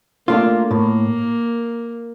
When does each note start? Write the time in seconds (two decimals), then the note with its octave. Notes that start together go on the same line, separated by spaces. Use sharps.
0.27 A3 A#3 D4 F4
0.71 A2 A#3